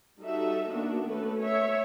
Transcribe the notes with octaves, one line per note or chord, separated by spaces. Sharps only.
G3 D#4 F#4 A4 E5
D#3 A#3 B3 D4 F#4
A3 C#4 A4 B4
C#5 E5